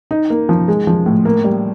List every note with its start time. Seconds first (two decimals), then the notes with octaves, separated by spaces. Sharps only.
0.11 D#4
0.30 A#3
0.49 F3
0.68 G#3
0.87 F3
1.06 A2
1.25 A#3
1.44 G3